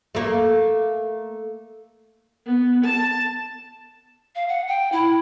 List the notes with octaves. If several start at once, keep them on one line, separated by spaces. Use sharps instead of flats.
A3 A#3
B3
A5
F5
F#5
G5
E4